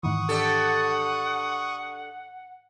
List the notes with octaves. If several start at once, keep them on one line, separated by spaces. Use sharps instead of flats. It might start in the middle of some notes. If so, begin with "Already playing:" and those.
G#2 D#3 E3 F#5 C#6 D#6
D4 G4 A4